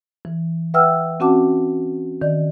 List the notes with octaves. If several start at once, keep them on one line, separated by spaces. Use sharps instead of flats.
E3
B4 E5 F#5 G5 E6 F6
C4 C#4 F#4 F#5 A5 D6
D#3 D5